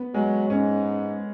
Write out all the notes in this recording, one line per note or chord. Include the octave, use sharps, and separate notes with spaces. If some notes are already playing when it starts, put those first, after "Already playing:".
Already playing: B3
F#3 G#3
G#2 C#4